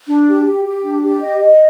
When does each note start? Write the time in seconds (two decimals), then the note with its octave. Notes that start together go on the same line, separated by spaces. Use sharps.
0.07 D4
0.26 G4
0.45 G4
0.64 G4
0.83 D4
1.03 G4
1.21 D#5
1.41 D#5